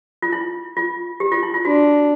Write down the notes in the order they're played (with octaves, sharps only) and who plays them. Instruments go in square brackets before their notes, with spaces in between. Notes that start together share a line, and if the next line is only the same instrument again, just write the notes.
[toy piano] F4
E4
F4
G4
F4
E4
F4
[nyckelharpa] D4 [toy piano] F#4